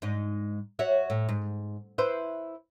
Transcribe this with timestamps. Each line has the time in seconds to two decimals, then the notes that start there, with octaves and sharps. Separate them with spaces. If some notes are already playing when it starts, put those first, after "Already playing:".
0.02 G#2 D#4
0.79 F#4 C#5 E5
1.10 A2
1.29 G#2
1.98 E4 B4 C5